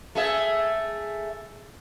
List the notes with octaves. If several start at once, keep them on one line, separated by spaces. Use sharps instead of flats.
A3 G#4 E5